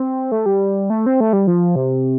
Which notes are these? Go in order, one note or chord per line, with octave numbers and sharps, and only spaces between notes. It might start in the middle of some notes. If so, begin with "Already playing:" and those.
Already playing: C4
A3
G3
A3
C4
A3
G3
F3
C3